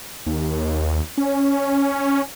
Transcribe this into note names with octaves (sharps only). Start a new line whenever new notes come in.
D#2
C#4